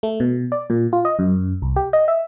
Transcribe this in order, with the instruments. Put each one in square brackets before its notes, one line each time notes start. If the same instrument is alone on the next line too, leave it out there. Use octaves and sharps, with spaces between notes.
[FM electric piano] A3
B2
D5
A#2
F4
D#5
F#2
C2
G4
D#5
E5